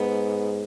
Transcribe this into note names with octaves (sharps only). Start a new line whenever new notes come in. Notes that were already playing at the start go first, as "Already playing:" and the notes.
Already playing: G#2 B3